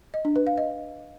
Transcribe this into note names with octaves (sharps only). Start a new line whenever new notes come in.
D#5
D4
B4
F5
D#5